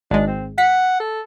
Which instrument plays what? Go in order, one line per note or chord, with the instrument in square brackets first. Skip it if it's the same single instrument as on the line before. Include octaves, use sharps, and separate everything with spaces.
[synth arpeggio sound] G#1 G#3 [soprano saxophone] D4
[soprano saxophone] C4
[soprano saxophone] F#5 [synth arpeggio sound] B6
[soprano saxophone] A4